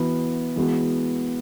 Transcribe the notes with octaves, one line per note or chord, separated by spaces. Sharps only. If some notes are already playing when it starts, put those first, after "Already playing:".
Already playing: E3 B3 F#4 B4
E3 G#3 B3 F#4